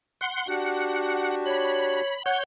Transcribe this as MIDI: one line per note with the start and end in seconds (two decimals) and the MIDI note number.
0.21 0.48 78
0.21 0.48 84
0.48 2.01 62
0.48 2.01 66
0.48 2.01 67
0.48 1.35 78
1.46 2.16 73
1.46 2.23 83
2.26 2.43 73
2.26 2.37 78
2.26 2.43 91